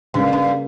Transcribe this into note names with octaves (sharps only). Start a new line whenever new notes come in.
G2 C#3 G3 A#3
G2